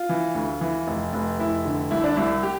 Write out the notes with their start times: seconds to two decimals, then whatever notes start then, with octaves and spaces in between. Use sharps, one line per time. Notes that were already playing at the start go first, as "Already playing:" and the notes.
Already playing: F4
0.09 E3
0.35 D2
0.61 E3
0.87 F1
1.13 F1
1.39 F1 E4
1.65 D3
1.91 C2 E4
2.04 D4
2.16 C2 E4
2.43 G4